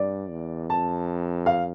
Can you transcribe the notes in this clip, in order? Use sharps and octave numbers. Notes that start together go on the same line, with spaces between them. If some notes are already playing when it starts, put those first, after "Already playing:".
Already playing: G2 D5
E2
F2 A5
F5